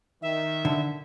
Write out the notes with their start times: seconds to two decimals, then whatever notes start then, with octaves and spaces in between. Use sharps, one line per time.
0.22 D#3 E5
0.65 D3